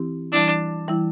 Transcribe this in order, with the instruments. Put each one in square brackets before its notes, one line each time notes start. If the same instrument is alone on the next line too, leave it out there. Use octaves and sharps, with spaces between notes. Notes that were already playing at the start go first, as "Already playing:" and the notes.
Already playing: [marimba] E3 C4 E4 G4
[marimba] E3 G3 E4 [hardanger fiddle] D4
[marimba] E3 G3 E4